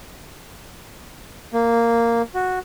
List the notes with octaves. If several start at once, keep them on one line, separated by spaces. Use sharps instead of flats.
A#3
F#4